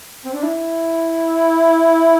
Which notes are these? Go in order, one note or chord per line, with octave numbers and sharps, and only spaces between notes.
C4
D4
E4